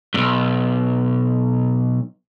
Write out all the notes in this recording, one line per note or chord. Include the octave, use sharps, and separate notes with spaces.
B1 G2